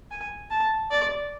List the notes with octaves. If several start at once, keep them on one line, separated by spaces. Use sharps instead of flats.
G#5
A5
D5